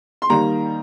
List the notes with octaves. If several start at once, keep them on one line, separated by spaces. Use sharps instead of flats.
C6
D#3 G3 A#3 A#5